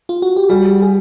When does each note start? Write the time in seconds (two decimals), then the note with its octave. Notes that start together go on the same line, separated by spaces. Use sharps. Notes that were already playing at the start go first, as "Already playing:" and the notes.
0.09 F4
0.22 F#4
0.37 G4
0.49 G3 F#4 G#4
0.82 G#4